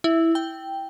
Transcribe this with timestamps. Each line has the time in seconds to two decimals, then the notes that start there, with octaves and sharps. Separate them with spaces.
0.04 E4
0.35 G5